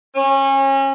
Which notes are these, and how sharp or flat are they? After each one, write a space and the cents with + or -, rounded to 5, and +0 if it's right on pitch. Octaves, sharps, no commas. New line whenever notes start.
C#4 -30